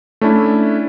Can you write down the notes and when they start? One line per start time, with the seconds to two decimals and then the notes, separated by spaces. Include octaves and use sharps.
0.21 A3 C#4 D4 E4